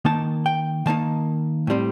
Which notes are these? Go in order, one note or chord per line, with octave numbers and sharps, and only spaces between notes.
D#3 A#3 D#4 A5
G5
D#3 A#3 D#4 A5
A2 G3 C4